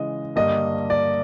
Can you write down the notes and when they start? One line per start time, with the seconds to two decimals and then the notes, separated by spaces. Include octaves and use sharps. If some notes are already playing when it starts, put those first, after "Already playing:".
Already playing: C#3 E3 G#3 D#5
0.36 G2 D3 G3 A#3 D#5
0.90 D5